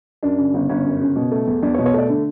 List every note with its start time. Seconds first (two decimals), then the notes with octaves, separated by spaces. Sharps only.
0.23 F#2 D4
0.38 C#3
0.54 G1
0.69 G1 C#4
0.85 F#2
1.01 C#3
1.16 B2
1.31 A3
1.47 E2
1.63 E2 D4
1.74 C#5
1.78 B2
1.86 C#5
1.94 A3 D5
2.09 D3